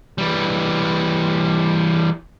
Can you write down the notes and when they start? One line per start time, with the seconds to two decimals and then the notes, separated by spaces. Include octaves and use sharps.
0.18 E3 G3